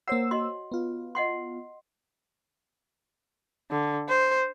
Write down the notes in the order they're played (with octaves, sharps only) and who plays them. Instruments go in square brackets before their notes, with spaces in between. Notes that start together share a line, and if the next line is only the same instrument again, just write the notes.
[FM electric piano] A#3 C5 E6 [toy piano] C#5 F#5
[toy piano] F#4 D#5 C6
[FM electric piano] B3 F4
[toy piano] D#5 F#5 C6
[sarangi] D3
C5